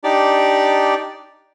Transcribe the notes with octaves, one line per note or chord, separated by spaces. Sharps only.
D4 D#4 G4 D5